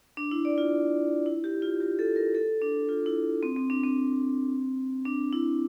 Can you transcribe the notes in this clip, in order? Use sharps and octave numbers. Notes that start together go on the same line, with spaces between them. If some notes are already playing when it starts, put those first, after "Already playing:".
D4
E4
D5
F4
E4
G4
F4
G4
A4
A#4
A4
D4
F4
E4
C4
C4
D4
C4
D4
E4